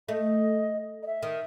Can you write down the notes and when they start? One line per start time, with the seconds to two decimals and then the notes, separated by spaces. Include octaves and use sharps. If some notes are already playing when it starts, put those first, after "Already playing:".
0.08 A3 D#5
1.03 D#5
1.07 E5
1.23 D#3